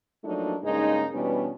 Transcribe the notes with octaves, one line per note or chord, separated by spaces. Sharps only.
F3 F#3 A3 A#3 D4 D#4
G2 C#3 G#3 A#3 D#4
B2 E3 G3 B3 C#4 D4